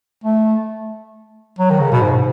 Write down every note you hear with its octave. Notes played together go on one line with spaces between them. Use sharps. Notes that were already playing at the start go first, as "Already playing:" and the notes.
A3
F#3
D#3
C#3
B2
G#2